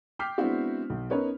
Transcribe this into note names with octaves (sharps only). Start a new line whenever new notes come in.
G5 D6 F6 G6 B6 C7
G#3 B3 C4 D4 E4 F#4
B1
B3 C#4 D#4 A#4 B4 C#5